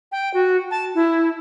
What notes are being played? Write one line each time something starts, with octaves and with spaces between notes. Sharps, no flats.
G5
F#4
A5
E4